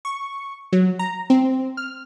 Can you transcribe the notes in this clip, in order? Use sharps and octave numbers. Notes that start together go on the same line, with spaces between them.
C#6
F#3
A#5
C4
F6